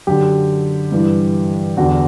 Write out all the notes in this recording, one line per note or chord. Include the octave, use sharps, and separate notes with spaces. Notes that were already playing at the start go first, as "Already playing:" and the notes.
F#2 D3 G4
G2 E3
E2 D3 F#4